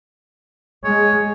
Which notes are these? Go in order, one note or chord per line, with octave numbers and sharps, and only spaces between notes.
G#3 C#5